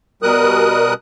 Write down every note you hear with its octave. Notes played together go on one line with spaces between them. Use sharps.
B2 G3 A#4 D#6 F#6